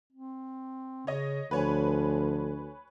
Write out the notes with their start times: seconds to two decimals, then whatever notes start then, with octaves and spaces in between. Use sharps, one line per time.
0.12 C4
1.07 C#3 C#5 D#5
1.51 D2 F3 B4 C#5 G#5